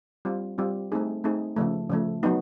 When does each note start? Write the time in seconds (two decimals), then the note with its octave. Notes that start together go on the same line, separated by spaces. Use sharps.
0.25 G3 C4 F4
0.58 G3 C4 F4
0.92 A3 C4 D#4 G#4
1.24 A3 C4 D#4 G#4
1.56 C#3 F3 A3
1.90 C#3 F3 A3
2.23 F#3 B3 D#4